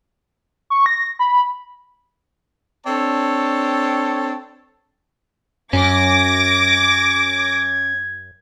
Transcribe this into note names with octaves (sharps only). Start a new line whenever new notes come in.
C#6
A#6
B5
C4 D4 A4 C#5 A5
F#2 C#4 D6 G#6 A#6